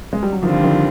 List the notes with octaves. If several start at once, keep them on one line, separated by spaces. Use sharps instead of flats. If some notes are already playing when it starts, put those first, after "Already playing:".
G#3
G3
F#3
D3 D#3 F3 G3 C4 F4
D#3 F3